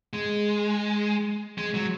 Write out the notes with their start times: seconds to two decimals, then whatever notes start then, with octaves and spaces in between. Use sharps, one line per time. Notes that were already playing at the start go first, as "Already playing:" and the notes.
0.13 G#3
1.58 G#3
1.74 F#3